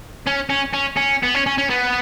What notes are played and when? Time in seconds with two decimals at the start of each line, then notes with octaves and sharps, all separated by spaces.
0.27 C#4
0.50 C#4
0.74 C#4
0.97 C#4
1.23 B3
1.35 C#4
1.46 C#4
1.58 C#4
1.70 B3